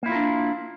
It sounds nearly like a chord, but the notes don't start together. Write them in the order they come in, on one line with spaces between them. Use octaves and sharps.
A#3 E4 F4 A#4 D4